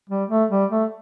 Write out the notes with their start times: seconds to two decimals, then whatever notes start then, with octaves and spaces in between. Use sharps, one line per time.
0.10 G3
0.30 A3
0.50 G3
0.71 A3